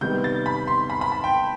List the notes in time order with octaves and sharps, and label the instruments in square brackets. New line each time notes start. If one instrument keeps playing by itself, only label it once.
[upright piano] C3 D#3 G3 B3 G6
A6
B5
C6
B5
B5
A5
G5